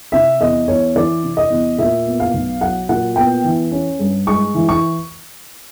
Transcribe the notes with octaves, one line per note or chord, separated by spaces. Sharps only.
C3 E5
E2 D#5
E2 C#5
E3 D5
C3
D#5
E2
A#2 E5
B3
F5
B1
F#3 F#5
A#2 F#5
B3 G5
E3
C#4
G2
G#3 C#6
E3
C#6